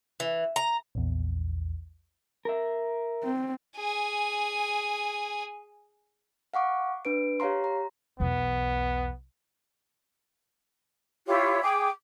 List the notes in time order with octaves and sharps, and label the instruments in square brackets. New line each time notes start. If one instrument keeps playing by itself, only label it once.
[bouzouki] E3
A#5
[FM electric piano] A#1 E2
[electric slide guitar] A#4 E5
[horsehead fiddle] C4
[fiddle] G#4 G#5
[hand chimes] F5 F#5 C#6 D6
D4 B4 D7
G4 C#5 F5 A#5 C6
A#5
[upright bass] B1 E2 [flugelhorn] B3
[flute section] E4 F4 G4 C#5
G#4 G5 D6